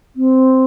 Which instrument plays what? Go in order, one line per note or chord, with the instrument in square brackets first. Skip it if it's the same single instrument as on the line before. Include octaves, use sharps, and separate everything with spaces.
[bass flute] C4